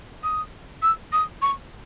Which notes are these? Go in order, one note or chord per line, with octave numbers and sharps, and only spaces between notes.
D#6
E6
D#6
C#6